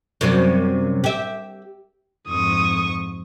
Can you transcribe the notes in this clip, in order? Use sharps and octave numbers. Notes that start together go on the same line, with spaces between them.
F#2 C3 G3
G4 E5
F2 G#2 C#6 D#6